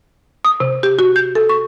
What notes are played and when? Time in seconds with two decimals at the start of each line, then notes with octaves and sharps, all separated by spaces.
0.45 D#6
0.60 C3
0.83 G4
0.99 F#4
1.16 G6
1.35 A4
1.49 C#6